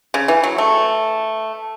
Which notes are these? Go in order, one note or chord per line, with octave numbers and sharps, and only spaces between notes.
C#3
E3
F#3
A3